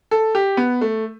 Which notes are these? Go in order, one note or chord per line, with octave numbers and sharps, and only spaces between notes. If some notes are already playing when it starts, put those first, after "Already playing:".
A4
G4
B3
A3